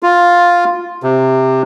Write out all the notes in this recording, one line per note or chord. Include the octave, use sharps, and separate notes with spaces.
F4
C3